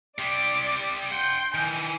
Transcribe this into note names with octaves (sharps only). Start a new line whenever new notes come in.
C3 G3 D5 D6
F#5 G5 C6 G6
D#3 E3 G#5